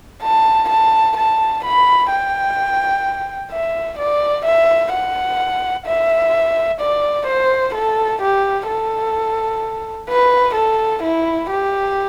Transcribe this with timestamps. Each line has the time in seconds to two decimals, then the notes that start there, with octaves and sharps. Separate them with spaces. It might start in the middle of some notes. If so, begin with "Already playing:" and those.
0.23 A5
0.70 A5
1.17 A5
1.65 B5
2.11 G5
3.52 E5
3.98 D5
4.45 E5
4.92 F#5
5.87 E5
6.80 D5
7.27 C5
7.75 A4
8.22 G4
8.67 A4
10.09 B4
10.55 A4
11.03 E4
11.50 G4